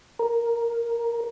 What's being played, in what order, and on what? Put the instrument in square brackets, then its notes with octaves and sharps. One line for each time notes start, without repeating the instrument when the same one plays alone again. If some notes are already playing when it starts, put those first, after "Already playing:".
[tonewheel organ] A#4